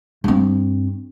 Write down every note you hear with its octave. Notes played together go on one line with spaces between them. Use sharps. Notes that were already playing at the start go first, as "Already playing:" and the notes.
G2 C4